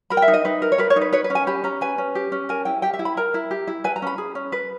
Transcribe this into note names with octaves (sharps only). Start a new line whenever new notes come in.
A#4 B5
G5
E5
D#4
D#5
D#4 B4
A#4
C#5
A#4 B4
C#5
D#4
B4
B4 C#5
B4
C#4
G#5
G4 B5
C#4 A#5
B4 G#5
C#4
G4
C#4
A#4 G#5
E4 G5
G4 G5
E5
E4
B5
A#4 A#5
E4
G4
E4
B4 G#5
A#5
C#4 B5
G#4
C#4
B4